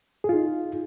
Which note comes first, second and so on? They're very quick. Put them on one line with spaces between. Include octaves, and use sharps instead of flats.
G#4 F4 D#4